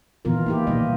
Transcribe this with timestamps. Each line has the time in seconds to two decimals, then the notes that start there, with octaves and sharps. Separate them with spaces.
0.25 A#2 D#3 E3 B3 F4 A#4
0.46 A#3 E4 G4
0.67 B2 D#3 G3 A#3 D#5